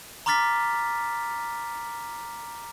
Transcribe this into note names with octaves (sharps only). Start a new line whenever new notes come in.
A#5 C6 D6 F6 A6 B6